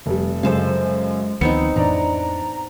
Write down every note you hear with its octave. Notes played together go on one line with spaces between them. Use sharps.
F1 G3
F#2 C#3 G#3 A4 C5 F5
D2 D#3 F3 B3 C4 D#4 C#7
F2 A2 E3 D4 D5 A#5